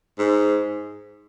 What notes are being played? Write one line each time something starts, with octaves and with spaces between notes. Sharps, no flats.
G#2